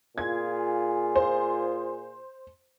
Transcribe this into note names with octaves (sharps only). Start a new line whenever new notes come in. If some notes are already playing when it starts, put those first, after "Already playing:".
A#2 F4 G#4 G#6
C5